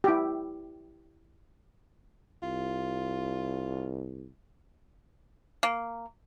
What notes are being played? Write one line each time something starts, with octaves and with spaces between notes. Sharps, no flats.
E4 G4
C2 F4
A#3